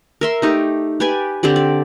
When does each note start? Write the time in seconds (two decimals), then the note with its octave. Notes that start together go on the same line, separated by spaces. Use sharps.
0.21 A#4 E5 C6
0.42 A3 D#4 G4
1.00 G4 B4 D5 G#5
1.43 D3 C4 G4 D5
1.56 D5